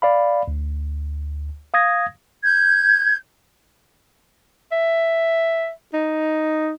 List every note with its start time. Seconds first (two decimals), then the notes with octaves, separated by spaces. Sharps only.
0.02 D5 F5 B5
0.48 D2
1.74 F5 D#6 G#6 A#6
2.43 G6 G#6
4.72 E5
5.93 D#4